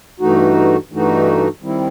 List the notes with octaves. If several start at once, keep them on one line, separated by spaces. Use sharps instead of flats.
G2 E3 A3 D#4 F#4
G2 E3 A3 D#4 F#4
D#3 G3 C4 E4